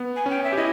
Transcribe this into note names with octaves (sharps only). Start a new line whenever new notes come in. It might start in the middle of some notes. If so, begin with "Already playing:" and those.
Already playing: B3
G#5
C#4 G5
E5
G4
E4 D#5